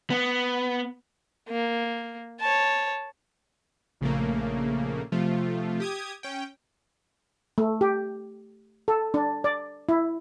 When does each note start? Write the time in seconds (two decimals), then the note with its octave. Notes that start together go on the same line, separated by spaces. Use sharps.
0.10 B3
1.49 A#3
2.41 C#5 A5
4.01 A#1 C#3 A3 A#3
5.12 C3 F3 A3 F4
5.80 G4 D#6 G#6
6.23 C#4 G5
7.58 A3
7.81 G4
8.88 A4
9.14 D4
9.44 D5
9.89 E4